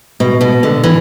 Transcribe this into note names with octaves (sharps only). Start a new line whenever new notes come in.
B2
B2
D3
E3